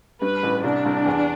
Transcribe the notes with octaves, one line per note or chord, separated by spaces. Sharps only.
G2 B4
A1
C2 D4
C2
E2